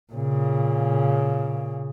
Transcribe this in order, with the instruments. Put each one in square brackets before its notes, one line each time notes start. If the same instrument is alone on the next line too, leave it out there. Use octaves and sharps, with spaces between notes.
[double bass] A#2 C#3